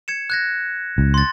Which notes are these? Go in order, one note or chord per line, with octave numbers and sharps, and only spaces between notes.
G#6 C#7 E7
F#6 G#6 A#6
C#2
C6 A6